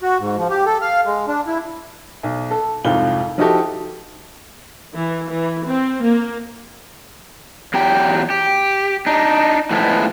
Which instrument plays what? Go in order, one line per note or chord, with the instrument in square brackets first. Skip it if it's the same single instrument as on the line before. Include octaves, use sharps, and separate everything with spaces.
[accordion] F#4
G#2
F3
G4
A4
F5
G#3
D4
E4
[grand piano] B1
A4
C2 F2 G#2 F4 G7
F3 D#4 E4 F#4 G4 A4
[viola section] E3
E3
C4
A#3
[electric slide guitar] E2 F#3 G4 G5
G4
D4 D#4
A2 E3 F3 G#3 A3 B3